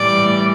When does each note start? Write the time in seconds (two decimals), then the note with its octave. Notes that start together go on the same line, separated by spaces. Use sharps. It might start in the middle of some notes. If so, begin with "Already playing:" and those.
Already playing: A2 E3 G3 D5